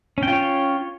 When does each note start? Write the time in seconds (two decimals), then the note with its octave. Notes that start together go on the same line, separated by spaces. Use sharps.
0.18 C#4
0.23 G5
0.28 F4
0.33 C#5